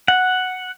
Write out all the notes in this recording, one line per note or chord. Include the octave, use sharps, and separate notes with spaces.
F#5